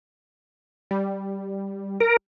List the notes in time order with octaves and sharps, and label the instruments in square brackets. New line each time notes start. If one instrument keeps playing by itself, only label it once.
[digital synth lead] G3
[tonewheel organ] A#4